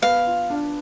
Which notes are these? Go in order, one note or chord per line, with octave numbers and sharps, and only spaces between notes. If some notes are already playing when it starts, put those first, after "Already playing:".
B3 F5
F4
D4